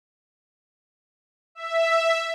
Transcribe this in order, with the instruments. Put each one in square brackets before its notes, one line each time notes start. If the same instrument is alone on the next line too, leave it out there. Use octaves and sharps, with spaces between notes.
[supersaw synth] E5